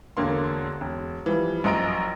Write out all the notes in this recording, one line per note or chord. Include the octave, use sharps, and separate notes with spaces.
E1 D3 A#3 C6
E1
E3 F3 G3
A#1 F#2 D#5 A#5 D7